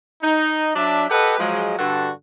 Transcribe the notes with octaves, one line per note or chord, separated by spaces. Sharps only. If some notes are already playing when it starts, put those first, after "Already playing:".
D#4
F#3 D4 D5 E5 A5
G4 A4 B4 D#5 F#5
F3 F#3 G#3
G2 D3 F#4 A4